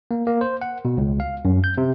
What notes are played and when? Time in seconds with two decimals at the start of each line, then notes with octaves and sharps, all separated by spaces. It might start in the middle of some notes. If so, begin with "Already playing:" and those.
0.11 A#3
0.27 A#3
0.41 C5
0.61 F#5
0.85 B2
0.97 C#2
1.20 F5
1.45 F#2
1.64 G6
1.78 C3